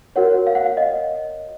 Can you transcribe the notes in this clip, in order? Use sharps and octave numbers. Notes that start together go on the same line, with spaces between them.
F#4 A#4 C#5 F#5
F5
F#5
F5
D#5